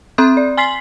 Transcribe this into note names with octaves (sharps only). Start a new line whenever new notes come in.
C4 E5 C6 D#6 F#6 G6
D5
G#5 C6 B6 C7 F#7